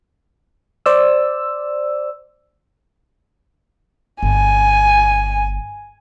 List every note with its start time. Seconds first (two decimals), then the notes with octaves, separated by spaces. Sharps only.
0.86 C5 D5 E6
4.22 G1 G#5